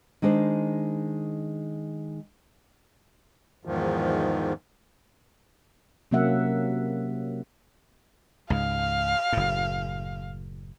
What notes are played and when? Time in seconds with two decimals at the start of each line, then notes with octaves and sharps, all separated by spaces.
0.22 D#3 G#3 D4 C5
3.65 E2 G#2 D#3 F3
6.11 C3 F#3 A#3 C#4 E5 F#5
8.50 C#2 G#2 F5
9.33 F#1 A2